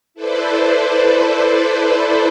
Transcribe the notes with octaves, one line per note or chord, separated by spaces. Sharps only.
E4 A4 B4 C5 D5